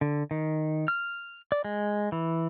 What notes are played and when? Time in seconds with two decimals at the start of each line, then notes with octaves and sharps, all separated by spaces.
0.01 D3
0.31 D#3
0.88 F6
1.52 D5
1.64 G#3
2.12 E3